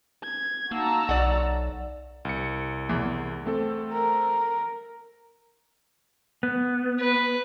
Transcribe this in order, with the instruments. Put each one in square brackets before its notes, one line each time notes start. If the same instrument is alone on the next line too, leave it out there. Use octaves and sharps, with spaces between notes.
[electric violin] G#6
[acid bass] A#3 [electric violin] D#4 E6 [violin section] F#4 A5 A#5
[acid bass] B1 [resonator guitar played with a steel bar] D5 F#5
[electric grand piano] C2 C#7
[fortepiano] E2
[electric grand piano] A3 C4 A4
[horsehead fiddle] A#4
[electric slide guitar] B3
[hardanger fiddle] B4